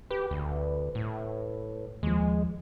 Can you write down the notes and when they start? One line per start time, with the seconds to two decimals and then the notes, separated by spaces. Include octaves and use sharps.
0.11 G4 B4
0.31 D2
0.95 A2
2.03 D#2 F3 G#3